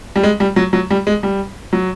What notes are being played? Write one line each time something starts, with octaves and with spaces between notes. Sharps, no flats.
G3
G#3
G3
F#3
F#3
G3
G#3
G3
F#3